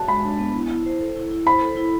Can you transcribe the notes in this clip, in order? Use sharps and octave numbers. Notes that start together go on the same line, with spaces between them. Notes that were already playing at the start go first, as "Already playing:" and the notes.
Already playing: F#4 A5
G#3 B5
D4
B3
E4
E4
C5
A4
E4
E4
C5 B5
A4
E4